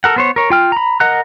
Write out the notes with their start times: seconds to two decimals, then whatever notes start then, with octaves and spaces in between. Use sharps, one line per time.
0.04 A4 A#4 F#5
0.16 B3 C5 C#5
0.36 A#4 C#5
0.50 F4 G5 F6
0.72 A#5 B5
1.00 A#4 D#5 F#5 A#5 F#6